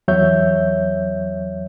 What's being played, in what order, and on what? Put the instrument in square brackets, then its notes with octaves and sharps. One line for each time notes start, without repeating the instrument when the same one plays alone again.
[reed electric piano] E2 F#3 C#5 E5 G6